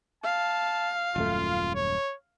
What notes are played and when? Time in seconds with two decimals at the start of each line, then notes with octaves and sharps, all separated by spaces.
0.24 F5 A5
1.16 D#1 F#2 A3 F4
1.75 C#5